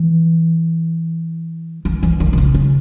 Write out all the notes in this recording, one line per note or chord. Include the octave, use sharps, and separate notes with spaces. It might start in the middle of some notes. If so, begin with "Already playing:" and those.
Already playing: E3
E3
E3
D#3
C3
C#3
C#3